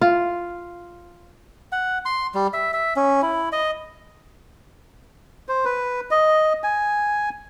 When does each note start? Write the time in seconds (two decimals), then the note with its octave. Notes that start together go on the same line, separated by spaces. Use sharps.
0.01 F4
1.72 F#5
2.05 C6
2.34 G3
2.54 E5
2.73 E5
2.96 C#4
3.22 E4
3.52 D#5
5.49 C5
5.65 B4
6.11 D#5
6.64 G#5